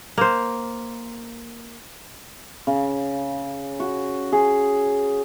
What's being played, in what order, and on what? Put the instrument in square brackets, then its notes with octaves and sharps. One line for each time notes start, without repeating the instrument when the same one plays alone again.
[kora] A#3 C5
[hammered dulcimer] C#3
F#4
G#4